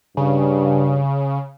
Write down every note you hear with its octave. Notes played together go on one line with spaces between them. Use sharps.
G2 C#3